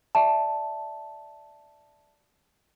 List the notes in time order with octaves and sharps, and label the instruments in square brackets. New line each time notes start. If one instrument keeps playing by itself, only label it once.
[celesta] D5 E5 A5